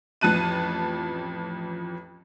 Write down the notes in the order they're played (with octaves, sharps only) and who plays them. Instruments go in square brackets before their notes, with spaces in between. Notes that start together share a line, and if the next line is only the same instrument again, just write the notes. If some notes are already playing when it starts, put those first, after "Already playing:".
[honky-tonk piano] A1 F2 A5 F#6 D#7